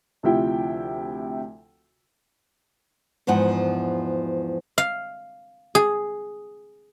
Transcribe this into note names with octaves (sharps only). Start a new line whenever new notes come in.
D2 C3 F3 E4 G5
E2 G#2 E3 F3 F#5
F5
G#4